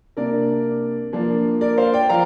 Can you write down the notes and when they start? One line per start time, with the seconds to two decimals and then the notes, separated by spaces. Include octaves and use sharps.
0.17 C3 A#3 D4 A#4 D5
1.13 F3 A#3 D4
1.61 A#4 D5
1.78 C5 F5
1.93 D5 G5
2.09 F3 F5 A#5